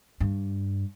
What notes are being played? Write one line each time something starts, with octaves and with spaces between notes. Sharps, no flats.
G2